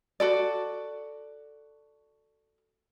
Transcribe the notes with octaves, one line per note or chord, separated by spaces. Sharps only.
F#4 A4 D5